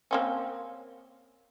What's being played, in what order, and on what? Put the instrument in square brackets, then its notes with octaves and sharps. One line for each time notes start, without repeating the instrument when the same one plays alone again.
[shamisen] A#3 C4 C#4